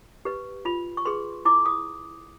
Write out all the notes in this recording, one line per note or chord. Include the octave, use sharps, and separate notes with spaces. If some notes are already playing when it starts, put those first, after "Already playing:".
G4 B4
F4 B5
C#6
G#4 B4 C6
E4 D6
D#6